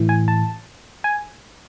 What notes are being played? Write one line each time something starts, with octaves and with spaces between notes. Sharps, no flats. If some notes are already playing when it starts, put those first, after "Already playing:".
Already playing: A2 E3
G#5
A5
G#5